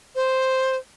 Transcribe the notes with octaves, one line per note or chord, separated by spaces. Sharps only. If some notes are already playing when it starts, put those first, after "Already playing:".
C5